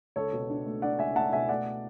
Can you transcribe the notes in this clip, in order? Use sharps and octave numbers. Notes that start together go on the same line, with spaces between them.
C#2 A4 C#5
B2
D4
A3
D4 D5 F#5
C#2 E5 G#5
A3 F#5 A5
B2 E5 G#5
A3 D5 F#5